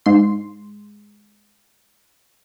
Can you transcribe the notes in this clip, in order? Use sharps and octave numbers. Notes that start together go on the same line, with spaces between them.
G#2 C6